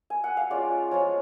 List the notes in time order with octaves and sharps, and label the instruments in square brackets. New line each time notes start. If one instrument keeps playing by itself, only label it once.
[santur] G#5
F#5
F5
G#3 C#4 F4 D5
F3 G#3 C#4 F4 C#5